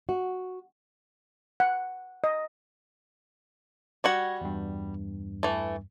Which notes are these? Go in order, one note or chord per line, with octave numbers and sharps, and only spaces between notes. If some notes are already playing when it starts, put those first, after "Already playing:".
F#4
F#5
D#5
G3 F#4 F#5 C#6 G#6 A#6
E2 G2
E3 A3